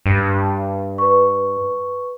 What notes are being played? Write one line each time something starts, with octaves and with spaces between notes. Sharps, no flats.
G2
B4 C#6